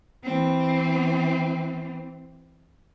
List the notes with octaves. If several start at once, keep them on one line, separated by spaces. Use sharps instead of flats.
E3 C4